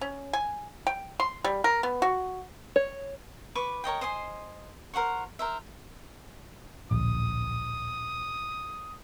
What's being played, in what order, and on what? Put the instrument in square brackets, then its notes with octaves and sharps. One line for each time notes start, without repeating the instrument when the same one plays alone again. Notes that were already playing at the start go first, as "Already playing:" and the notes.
[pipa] C#4
G#5
G5
C6
G3
A#4
B3
F#4
[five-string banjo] C#5
[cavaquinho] B4 C#6 D6
A#4 C#5 D#5 G5
C5 D#5 G#5 C6
A#4 C5 F#5 C#6
A#4 C5 E5
[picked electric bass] D1 A#1 [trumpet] D#6